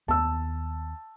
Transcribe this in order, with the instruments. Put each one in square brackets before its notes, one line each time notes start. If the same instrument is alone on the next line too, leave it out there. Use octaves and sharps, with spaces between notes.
[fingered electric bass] D#2 B3 [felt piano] A5 E6